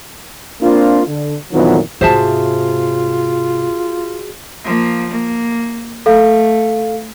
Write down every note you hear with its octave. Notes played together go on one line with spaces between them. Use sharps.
A#3 C4 D4 F4
D3
F2 A#2 D#3 E3 F#3 B3
G#2 C3 F4 F#4 G#4 C5 E5 A5
F3 A#3
A#3
A3 A4 F5